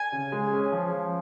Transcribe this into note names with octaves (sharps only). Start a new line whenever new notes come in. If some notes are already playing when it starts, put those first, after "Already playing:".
Already playing: G#5
C#3
G#3
C#4
F3
F3